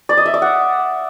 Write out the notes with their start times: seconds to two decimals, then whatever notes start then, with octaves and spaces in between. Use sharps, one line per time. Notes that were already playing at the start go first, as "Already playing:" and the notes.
0.09 D5
0.17 D#5
0.26 E5
0.34 D5
0.42 F#5